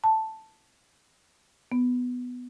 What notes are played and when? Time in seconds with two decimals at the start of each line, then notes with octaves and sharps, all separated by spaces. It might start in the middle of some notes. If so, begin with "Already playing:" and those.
0.04 A5
1.72 B3